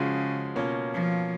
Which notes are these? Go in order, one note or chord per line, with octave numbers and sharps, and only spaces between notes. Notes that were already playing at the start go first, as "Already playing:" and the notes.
Already playing: C#3 F3 G#3 C#4 F#4
B2 A#3 C#4 F4
F3